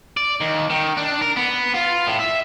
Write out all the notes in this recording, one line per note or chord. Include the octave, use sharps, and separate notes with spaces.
D5
D#2
D#3
D4
A#4
B3
F4
A2
E5